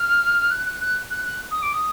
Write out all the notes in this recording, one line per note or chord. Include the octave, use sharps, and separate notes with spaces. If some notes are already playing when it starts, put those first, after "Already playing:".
Already playing: F6
F#6
F#6
F#6
F#6
F#6
D#6
D6
D#6